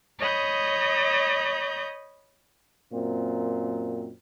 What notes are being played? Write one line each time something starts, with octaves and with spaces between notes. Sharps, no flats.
C#5 D#5 B5 D#6 G6
F#2 A#2 C4